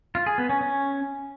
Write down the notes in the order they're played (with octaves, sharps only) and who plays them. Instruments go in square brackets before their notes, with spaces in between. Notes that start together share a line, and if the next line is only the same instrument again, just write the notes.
[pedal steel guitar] F4
G#4
B3
C#4
C#4